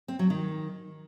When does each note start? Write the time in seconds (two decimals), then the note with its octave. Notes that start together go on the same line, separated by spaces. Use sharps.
0.08 C4
0.19 F#3
0.30 D#3